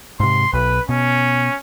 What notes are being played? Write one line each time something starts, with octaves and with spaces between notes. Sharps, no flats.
G#2 C3 C6
B1 B4
B2 C#4